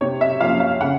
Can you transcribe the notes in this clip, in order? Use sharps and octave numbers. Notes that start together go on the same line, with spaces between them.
C3 C#5
E5
F3 A#3 C#4 F5
F5
C#3 F#5